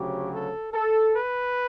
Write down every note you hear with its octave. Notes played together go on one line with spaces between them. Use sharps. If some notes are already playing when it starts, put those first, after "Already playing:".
Already playing: D2 C#3 F#3 G4
A4
A4
B4